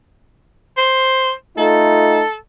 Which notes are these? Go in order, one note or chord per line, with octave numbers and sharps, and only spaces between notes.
C5
A3 D#4 F4 A4